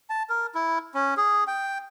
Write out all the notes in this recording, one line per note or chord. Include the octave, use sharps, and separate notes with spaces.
A5
A#4
E4
C#4
G#4
G5